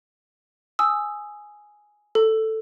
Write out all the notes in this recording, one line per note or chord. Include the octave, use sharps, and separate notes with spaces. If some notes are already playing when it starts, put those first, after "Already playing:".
G#5 D#6 E6
A4